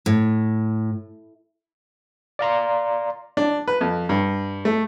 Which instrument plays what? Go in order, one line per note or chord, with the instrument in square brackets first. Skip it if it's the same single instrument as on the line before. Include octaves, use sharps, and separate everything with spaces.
[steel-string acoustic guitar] A2
[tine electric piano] D5 F5 A#5 C6
[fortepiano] D4
B4
F2
G2
A3